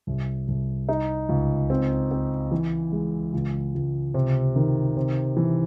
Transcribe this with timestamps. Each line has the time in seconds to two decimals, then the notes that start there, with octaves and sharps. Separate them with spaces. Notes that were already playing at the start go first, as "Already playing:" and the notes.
0.07 C2
0.48 C2
0.89 D#4
1.29 C#2
1.70 C4
2.11 C4
2.51 E3
2.92 G#3
3.33 C#2
3.75 C#2
4.14 C3
4.56 D#3
4.97 C3
5.37 E3